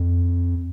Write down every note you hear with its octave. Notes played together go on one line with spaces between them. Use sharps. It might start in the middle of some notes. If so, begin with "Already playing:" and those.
Already playing: F2